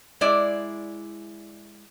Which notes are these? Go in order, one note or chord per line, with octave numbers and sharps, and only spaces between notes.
G#3 E4 D5